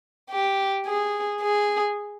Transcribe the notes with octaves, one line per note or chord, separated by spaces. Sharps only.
G4
G#4
G#4